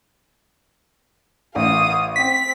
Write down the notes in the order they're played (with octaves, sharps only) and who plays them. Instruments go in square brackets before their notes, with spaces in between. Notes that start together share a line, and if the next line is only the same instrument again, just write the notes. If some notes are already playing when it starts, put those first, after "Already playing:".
[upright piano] A1 [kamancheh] F5 D#6
[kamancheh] C4 [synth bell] B6